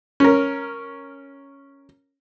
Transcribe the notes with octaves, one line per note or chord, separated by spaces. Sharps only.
C#4 A#4